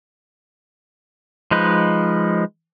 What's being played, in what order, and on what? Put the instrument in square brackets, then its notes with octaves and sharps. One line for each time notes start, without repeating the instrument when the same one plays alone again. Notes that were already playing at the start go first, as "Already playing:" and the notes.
[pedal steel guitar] F3 G#3 D#4 B4